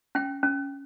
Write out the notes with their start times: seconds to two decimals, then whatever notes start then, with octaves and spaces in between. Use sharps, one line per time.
0.15 C#4 G5
0.43 C#4